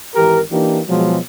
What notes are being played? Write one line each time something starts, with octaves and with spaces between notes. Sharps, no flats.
G#1 E3 G4 A#4
E3 A#3 D4 D#4 G4
B2 F3 F#3 G#3